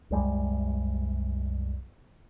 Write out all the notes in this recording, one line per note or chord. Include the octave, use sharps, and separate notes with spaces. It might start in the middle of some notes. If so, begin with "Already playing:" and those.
C2 F#2 G3 G#3